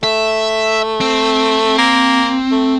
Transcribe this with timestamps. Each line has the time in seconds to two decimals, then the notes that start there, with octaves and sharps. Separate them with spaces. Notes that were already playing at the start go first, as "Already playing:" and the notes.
0.03 A3 E5
1.00 C4
1.78 A#3
2.51 A3